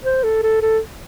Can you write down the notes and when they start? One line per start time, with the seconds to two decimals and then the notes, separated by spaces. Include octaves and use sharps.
0.05 C5
0.24 A4
0.43 A4
0.62 A4